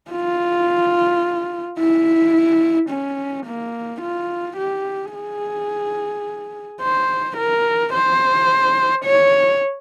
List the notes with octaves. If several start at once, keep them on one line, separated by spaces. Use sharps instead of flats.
F4
E4
C#4
A#3
F4
G4
G#4
C5
A#4
C5
C#5